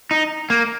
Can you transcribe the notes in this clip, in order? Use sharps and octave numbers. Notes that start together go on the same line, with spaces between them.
D#4
A#3